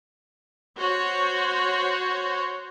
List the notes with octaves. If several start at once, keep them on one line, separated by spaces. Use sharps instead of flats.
F#4 C5 C#5